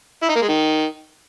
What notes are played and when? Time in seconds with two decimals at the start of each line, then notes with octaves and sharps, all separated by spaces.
0.22 E4
0.29 D#4
0.35 A#3
0.42 G#3
0.48 D#3